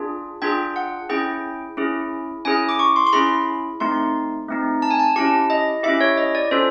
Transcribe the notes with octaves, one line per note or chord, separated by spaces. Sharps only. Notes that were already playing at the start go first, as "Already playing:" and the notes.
Already playing: D4 F4 G#4
D4 F4 G#4 G5
F#5
C#4 E4 G#4 G5
C#4 E4 G#4
C#4 E4 G#4 G#5
D6
C#6
C6
C6
C#4 E4 G#4 B5
A3 C4 D#4 C6
A3 C4 D#4
A5
G#5
A5
C#4 E4 G4 A5
D#5
C#4 E4 G4 E5
C#5
D#5
D5
C#4 F4 A4 C5